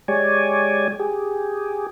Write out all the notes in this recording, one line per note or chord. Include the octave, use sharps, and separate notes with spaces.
G#3 G4 C#5 D5 G#5
G4 G#4